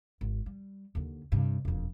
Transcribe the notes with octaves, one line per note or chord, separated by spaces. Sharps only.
G#1
G3
D#2 D3
G2 C3
E1 F2